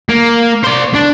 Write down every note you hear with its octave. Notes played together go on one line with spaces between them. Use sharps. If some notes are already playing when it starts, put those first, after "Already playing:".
A#3
C5 D5
D4